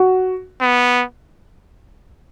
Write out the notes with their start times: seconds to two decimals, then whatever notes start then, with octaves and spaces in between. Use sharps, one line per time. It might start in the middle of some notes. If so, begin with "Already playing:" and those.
Already playing: F#4
0.61 B3